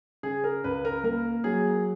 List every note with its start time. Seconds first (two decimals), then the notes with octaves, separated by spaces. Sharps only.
0.23 C#3 G#4
0.44 A#4
0.64 C#2 B4
0.85 A#4
1.04 A#3 A#4
1.44 F#3 G#4